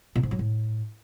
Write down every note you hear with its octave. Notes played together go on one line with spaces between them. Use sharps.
A#2
G#2
F#3
A2